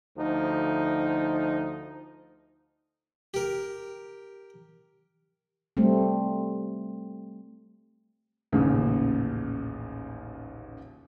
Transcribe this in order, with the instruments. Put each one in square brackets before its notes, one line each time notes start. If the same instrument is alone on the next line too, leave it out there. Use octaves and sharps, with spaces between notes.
[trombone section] D2 F3 D#4
[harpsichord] G4 A#4
[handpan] G3 A3 C4
[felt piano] A1 D#2 A#2 C#3